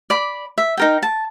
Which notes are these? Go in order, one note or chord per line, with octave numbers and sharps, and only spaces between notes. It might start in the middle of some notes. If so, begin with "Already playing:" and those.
D5 B5
E5
D#4 A#4 G5
A5